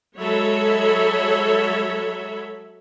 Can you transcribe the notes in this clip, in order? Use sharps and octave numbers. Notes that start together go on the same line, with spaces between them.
F#3 G#3 A4 C#5 E5 B5